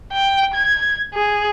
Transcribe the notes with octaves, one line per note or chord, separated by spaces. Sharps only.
G5
G#6
G#4